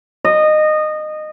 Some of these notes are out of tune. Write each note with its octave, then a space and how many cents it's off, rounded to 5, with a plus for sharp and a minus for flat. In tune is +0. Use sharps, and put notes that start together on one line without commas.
D#5 -20